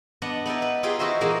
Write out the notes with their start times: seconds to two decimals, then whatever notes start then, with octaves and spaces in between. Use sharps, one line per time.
0.22 B3 D4 D#5 F#5
0.46 B3 D#4 E4 D5
0.62 B4
0.83 D#4 F4 G4 G#4 F5 G5
0.99 D#4 E4 F#4 C5 D#5 E5
1.21 A#2 E3 G#3 A#3 D#4